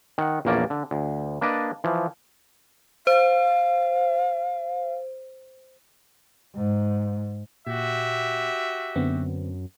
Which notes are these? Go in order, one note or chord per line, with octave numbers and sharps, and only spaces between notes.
D#3 F#5
A#1 E2 A#3 C#4 D5 A5
D3
D2
A#3 D4 B4 D5 D#5 A5
E3 F3
C5 F5
G#2
A#2 F#4 G4 E5
F#2 D3 B3 C4